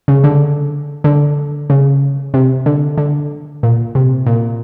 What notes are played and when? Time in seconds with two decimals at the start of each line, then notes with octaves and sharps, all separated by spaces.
0.08 C#3
0.24 D3
1.04 D3
1.70 C#3
2.34 C3
2.66 D3
2.98 D3
3.63 A#2
3.95 C3
4.27 A#2